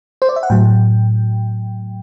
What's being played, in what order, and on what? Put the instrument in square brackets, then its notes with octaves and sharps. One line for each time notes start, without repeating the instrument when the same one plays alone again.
[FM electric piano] C5
D5
E5
F#5
A2 F#3 G5